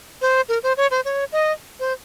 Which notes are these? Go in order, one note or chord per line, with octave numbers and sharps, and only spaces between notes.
C5
A#4
C5
C#5
C5
C#5
D#5
C5